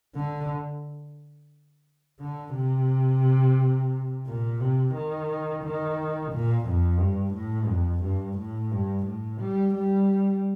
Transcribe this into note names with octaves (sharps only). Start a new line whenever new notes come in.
D3
D3
C3
A#2
C3
D#3
D#3
A#2
F2
G2
A2
F2
G2
A2
G2
A2
G3
G3